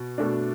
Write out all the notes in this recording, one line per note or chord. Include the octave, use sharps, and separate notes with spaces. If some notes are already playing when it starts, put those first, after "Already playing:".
Already playing: B2
B2 A3 D4